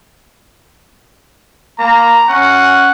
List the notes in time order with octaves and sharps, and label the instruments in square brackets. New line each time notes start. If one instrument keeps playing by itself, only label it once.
[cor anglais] A#3 [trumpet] A#5
[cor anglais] C#4 [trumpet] F#5